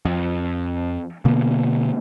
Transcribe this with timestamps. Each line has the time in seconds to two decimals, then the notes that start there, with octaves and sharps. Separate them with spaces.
0.05 F2
1.25 B2 D3 A#3 B3